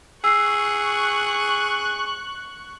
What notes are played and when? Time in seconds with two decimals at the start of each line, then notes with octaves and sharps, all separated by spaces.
0.24 G#4 C#6 E6 F#6 C7